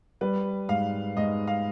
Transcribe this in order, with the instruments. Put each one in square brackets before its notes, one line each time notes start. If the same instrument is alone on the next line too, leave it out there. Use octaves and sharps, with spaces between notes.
[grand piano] G3 [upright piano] B4
[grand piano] G#2 [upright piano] F5
[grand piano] G#2 [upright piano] D#5
[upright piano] F5